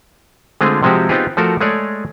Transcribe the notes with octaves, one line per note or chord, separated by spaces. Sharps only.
D3 G#3 A3 C4 F4 G#4
C3 F3 G#3 C4 F#4 G4
B3 C4 D#4 F4 G4 G#4
F3 A3 F#4 A4 A#4 C5
G#3 A3 G#4 C#5 D5